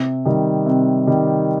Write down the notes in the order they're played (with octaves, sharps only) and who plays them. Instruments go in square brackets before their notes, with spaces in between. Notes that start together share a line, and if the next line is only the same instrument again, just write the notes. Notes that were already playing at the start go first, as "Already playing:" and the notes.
Already playing: [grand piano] C3
D#3 G3
C3
D#3 G3